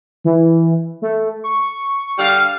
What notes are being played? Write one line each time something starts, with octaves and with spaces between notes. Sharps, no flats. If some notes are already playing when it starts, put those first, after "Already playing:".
E3
A3
C#6
D3 G3 F5